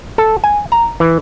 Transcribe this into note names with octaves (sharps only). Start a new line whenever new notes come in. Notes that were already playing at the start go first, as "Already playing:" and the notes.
A4
G#5
A#5
E3